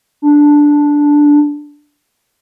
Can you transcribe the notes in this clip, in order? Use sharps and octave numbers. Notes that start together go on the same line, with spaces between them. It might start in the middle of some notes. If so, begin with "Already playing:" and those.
D4